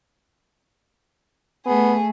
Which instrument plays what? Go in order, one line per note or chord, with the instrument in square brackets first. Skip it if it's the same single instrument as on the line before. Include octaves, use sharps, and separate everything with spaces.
[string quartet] A3 G#4 [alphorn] B3